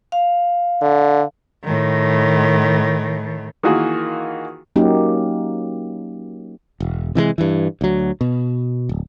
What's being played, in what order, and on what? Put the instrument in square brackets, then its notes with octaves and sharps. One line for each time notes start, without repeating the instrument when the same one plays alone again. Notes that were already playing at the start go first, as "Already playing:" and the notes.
[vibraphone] F5
[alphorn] D3
[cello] A2 D#3
[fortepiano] D#3 E3 A#3 F4 F#4 G#4
[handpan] F#3 A#3 C#4 D#4 F#4 G4
[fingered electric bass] E1
C3 E3 F#3 G#3
G2 E3
D2 F#3
B2
D1